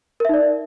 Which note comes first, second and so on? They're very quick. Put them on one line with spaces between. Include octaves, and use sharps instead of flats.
A#4 E5 D#4 D5